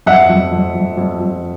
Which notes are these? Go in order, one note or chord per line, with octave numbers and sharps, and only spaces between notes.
F2 E5 F#5
F2
F2
F2
F2
F2